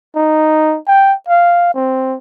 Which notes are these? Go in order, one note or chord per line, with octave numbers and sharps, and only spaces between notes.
D#4
G5
F5
C4